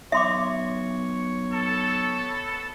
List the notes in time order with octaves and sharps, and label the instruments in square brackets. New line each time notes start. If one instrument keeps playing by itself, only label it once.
[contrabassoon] B1 [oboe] C#5 [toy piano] E5 C6 D6
[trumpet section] B3 A4